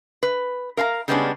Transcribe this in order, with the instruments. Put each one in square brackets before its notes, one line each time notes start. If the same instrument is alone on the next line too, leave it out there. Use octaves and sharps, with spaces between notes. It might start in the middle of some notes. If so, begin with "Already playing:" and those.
[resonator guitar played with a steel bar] B4
A#4 F5 A5 A#5
C#3 G3 G#3 B3 C#4 D4